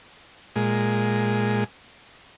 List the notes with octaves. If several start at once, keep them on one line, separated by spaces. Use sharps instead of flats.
A#2 G#3